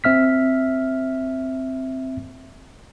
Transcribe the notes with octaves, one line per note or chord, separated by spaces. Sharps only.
C4 E5 F6 B6